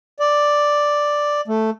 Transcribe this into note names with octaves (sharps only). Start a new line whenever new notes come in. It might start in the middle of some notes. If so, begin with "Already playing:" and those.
D5
A3